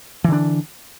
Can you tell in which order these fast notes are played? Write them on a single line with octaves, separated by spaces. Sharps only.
E3 D3 D4